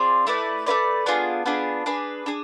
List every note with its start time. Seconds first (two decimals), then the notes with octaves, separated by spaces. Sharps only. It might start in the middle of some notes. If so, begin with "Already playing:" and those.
Already playing: C4 F4 G#4 D5
0.27 A3 E4 B4 D5
0.66 A3 E4 B4 D5
1.06 B3 D4 F4 G#4
1.46 B3 D4 F4 G#4
1.86 D4 G#4 B4
2.26 D4 G#4